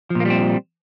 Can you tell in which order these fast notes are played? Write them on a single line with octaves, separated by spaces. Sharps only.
F3 A#2 A#3 G3 C4